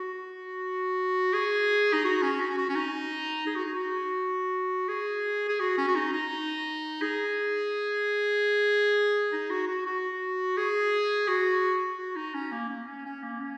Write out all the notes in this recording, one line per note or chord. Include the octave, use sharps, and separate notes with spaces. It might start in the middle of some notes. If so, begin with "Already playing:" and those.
Already playing: F#4
G#4
D#4
F#4
C#4
F#4
F#4
C#4
D#4
G#4
F#4
D#4
F#4
G#4
G#4
F#4
C#4
F#4
D#4
D#4
G#4
D#4
F#4
F#4
F#4
G#4
F#4
F#4
D#4
C#4
A#3
A#3
C#4
C#4
A#3
C#4